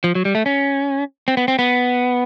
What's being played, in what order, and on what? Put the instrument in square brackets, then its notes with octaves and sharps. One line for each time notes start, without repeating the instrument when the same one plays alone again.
[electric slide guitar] F3
F#3
G3
A3
C#4
C4
B3
C4
B3